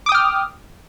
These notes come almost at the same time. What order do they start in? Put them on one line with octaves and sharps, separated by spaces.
D6 D#6 G5 F6